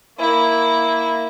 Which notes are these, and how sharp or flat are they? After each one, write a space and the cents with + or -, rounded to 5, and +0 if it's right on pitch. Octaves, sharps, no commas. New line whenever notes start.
A#3 +0 E4 -5